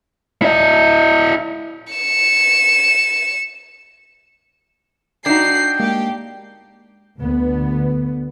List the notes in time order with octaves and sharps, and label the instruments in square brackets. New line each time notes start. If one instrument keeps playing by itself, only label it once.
[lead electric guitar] E4 D#5
[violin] C#7 E7
[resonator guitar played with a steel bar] D4 D#4 [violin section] F#4 C7 [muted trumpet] G5
[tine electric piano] G#3 A#3 [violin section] G4
[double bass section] D2 D3 B3